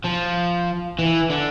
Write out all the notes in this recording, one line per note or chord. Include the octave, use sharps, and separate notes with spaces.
F3
E3
D3